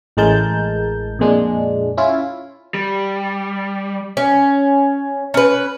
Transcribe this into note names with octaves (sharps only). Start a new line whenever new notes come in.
A1 A2 G#3 A#4 A5 G6
F2 A#2 G#3 D4
C#4 E4 F4
G3
C#4
C#4 B4